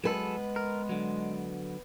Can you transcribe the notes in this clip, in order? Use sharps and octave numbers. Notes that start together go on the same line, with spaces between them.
F#3 G#3 B3 G#4 A4 B4
A#4
D3 F#3